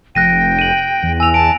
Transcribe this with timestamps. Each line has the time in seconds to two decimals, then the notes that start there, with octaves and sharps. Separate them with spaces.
0.15 F1 G5 F#6 A#6 D#7
0.59 D#7 F#7
1.03 E2
1.20 G#5 E6 F7
1.34 A5 D7